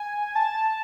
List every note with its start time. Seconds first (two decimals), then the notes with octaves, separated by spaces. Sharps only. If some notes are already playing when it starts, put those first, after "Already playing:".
Already playing: G#5
0.35 A5